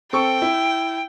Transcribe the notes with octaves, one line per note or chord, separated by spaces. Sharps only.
C4 A4 G5 C#6
E4